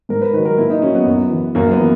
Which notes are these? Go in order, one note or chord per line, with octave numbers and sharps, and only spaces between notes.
G#2 A#4
B4
D#3 F#3 B4
A#4
A#2 E4
D#4
F#3 C#4
B3
F#2
E3
F#2 A#3
B3
E3